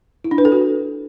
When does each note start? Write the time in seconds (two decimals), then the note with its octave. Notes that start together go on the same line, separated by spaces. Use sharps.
0.24 E4
0.31 D4
0.38 B4
0.45 A4
0.52 F#4